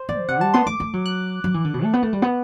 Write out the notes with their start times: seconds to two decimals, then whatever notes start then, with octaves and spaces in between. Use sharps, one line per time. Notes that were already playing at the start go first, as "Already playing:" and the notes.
Already playing: C5
0.09 B3 D5
0.21 D3
0.28 C3 F#5
0.41 G3 A5
0.54 B3 C6
0.66 A3 D6
0.80 A3
0.93 F#3
1.06 F#6
1.44 F#3
1.54 E3
1.65 D3
1.74 B2
1.84 A3
1.93 B3
2.03 A3
2.13 G3
2.22 B3